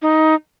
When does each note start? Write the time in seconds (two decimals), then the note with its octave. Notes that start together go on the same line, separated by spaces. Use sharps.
0.02 D#4